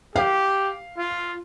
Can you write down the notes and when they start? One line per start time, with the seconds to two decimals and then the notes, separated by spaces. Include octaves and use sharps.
0.16 G4 F5
0.98 F4